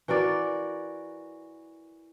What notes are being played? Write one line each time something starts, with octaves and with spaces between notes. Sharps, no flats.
E3 F#4 A#4 D5